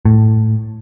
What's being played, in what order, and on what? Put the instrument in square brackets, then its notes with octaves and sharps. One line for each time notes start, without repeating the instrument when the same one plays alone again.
[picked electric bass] A2